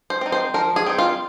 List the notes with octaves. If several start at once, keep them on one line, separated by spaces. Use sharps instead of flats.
C5
C4 D#4
C5
F3 A#4
G#4
C4 D#4
F4